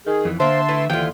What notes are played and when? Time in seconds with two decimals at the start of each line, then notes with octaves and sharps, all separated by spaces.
0.07 D#3 G#4
0.25 F2 E3
0.40 D3 A#3 C5 E5 A5 C6
0.68 A3 E4 B4
0.90 D#2 D3 E3 F3 E4 F4 G5